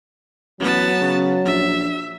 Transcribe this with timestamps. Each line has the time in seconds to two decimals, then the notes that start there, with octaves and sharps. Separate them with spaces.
0.60 A1 F#3 B3 A5
1.01 C#3
1.45 A#1 E5